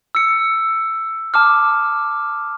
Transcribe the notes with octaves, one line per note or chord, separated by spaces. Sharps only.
E6 C#7
A5 D6 F6